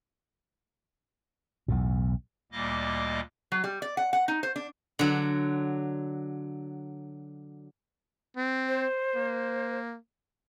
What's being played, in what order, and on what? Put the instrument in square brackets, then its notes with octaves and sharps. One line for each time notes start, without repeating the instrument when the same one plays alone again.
[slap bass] B1 E2 A2
[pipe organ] D2 A#2 G3 A#3 D#5 D6
[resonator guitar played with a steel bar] F#3
G3
D5
F#5
F#5
D#4
C5
D4
[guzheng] D3 F#3
[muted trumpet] C4
[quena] C5
[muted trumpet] A#3